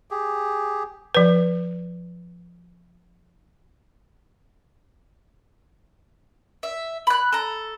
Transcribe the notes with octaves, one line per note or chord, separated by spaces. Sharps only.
G4 G#4
F3 B4
E5
B5 F#6
A4 A#5